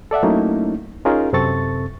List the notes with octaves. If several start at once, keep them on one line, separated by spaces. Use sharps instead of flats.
A4 D5 E5 F#5
F#3 A3 A#3 C#4 D#4 E4
C#4 D#4 F4 G#4 A#4
F#2 C3 C4 A4 C#6 A6